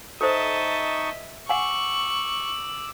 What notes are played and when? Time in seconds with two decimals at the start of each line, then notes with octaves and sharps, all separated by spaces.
0.21 D#4 A4 C5 D#5 E5 A5 C#6
1.49 F#5 G#5 C#6 D6 E6 F#7